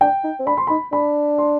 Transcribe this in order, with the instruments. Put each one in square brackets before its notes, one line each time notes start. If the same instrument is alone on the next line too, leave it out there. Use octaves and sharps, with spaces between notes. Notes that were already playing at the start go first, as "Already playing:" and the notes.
[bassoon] D4 [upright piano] G5
[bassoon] D#4
C4
[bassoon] D4 [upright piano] B5
[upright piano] C6
[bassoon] D#4 [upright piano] B5
[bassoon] D4 [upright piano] B5
[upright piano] C6